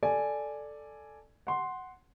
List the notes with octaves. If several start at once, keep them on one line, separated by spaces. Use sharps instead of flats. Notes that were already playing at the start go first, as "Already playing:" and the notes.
A4 D5 G#5
F#5 C6